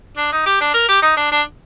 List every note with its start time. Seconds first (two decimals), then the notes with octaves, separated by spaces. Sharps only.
0.17 D4
0.32 D#4
0.46 G4
0.61 D4
0.74 A#4
0.89 G4
1.03 D#4
1.17 D4
1.32 D4